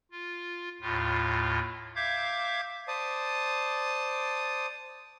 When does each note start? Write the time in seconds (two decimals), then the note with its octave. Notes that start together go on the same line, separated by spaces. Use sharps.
0.12 F4
0.81 D#2 A2 F4
1.96 E5 F5 D6 G6 G#6
2.88 C5 D5 A5 D#6